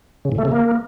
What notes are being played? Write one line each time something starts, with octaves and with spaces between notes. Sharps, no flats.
C#3
A2
A3
C#3
A#3